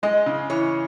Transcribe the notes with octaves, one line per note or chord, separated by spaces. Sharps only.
G#3 D#5
C#3
E3 C#5